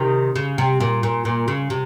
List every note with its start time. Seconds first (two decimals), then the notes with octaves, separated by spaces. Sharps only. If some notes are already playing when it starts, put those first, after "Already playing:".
Already playing: C3 D#3
0.36 C#3
0.58 C3
0.80 A#2
1.03 A#2
1.25 A#2
1.48 C#3
1.70 C3